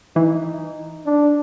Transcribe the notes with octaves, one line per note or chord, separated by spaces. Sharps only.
E3 D#4
D4